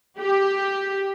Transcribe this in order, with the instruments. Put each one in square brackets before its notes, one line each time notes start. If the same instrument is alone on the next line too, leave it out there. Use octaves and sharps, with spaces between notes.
[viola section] G4